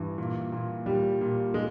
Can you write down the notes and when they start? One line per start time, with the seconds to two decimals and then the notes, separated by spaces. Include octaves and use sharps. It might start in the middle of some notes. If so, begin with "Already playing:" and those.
Already playing: G2 E3
0.18 A#2
0.52 A#2
0.86 A#2 G3
1.21 A#2
1.54 G#3